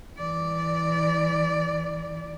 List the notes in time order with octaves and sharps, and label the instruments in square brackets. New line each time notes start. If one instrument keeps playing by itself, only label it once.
[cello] E3 D5